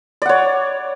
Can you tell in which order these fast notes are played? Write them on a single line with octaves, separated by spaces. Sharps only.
D5 F#5 C#5